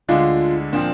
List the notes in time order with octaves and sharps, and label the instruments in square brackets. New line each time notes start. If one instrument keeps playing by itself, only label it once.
[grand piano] D2 D3 G#3 D4 [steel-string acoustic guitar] F4
[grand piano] A#2 F3 C4 [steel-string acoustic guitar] D4